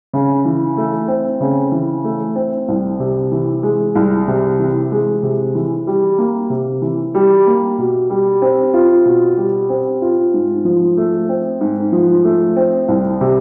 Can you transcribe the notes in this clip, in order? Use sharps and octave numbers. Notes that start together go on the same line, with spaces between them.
C#3
E3
A3
C4
C#3
E3
A3
C4
C2
C3
E3
G#3
C2
C3
E3
G#3
C3
E3
G3
A#3
C3
E3
G3
A#3
B2
G3
C4
F4
B2
G3
C4
F4
G#2
F3
A3
C4
G#2
F3
A3
C4
C2
C3